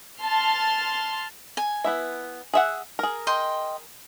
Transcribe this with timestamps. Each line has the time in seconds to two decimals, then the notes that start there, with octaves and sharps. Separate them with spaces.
0.22 A5 C6 F6
1.57 G#5
1.84 B3 E4 E5
2.53 G#4 E5 F#5
2.99 G#4 A#4
3.27 D#5 G5 C6